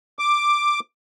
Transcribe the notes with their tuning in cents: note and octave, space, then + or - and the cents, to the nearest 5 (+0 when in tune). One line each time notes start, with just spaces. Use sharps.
D6 +5